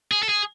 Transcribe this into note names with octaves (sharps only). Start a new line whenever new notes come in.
G#4
A4
G#4